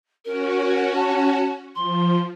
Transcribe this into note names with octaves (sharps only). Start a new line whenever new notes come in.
C#4 F#4 A#4
A5
F3 C6